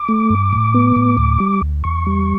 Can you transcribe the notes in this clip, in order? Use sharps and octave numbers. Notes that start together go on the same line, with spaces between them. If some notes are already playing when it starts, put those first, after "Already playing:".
Already playing: D6
A3
G2
A2
B3
A2
D2
G3
D2
E2 C#6
G3